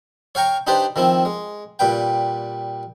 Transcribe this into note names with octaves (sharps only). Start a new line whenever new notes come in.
C#5 F5 G5 A#5 C#6
D4 D#4 G4 B4 C5 D5
D#3 F3 C4 E4
G#3
A#2 G3 B4 G5